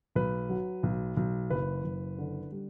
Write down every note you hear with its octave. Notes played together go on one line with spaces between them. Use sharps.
B1 B4
F#3
B1
B1
F#1 B4
F#1
D3
G3